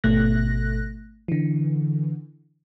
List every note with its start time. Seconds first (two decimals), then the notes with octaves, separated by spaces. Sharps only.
0.04 G#1 B2 A3 F#6 A#6
1.28 D3 E3